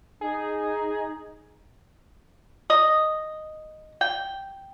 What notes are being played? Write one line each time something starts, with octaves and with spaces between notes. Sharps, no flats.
D#4 G#4
D#5
G5